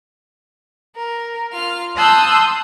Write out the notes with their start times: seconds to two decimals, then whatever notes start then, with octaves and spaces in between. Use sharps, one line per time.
0.96 A#4
1.52 F4 F6
1.96 A5 C6 D#6 E6 F#6 G6